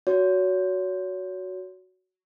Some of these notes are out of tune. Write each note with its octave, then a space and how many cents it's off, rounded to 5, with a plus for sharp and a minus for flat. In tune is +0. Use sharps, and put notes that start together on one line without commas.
F#4 +0 C#5 +30